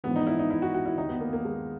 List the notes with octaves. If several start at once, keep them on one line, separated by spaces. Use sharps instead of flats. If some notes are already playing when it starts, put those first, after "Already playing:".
A#1 G#2 E3 B3
D#4
E4
D#4
E4
F#4
F#4
E4
D#2 D#3 D#4
B3
A#3
A#3
G#3